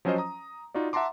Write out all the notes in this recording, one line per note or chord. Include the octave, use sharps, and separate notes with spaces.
F3 F#3 C#4 F4 C5 D#5
A#5 D#6
D#4 F4 F#4 D5
E5 F#5 A5 A#5 C6 D6